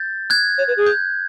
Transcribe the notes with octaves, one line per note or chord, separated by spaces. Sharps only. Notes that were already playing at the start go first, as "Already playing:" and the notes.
Already playing: G6 A6
F#6 G#6
C#5
B4
G#4
G6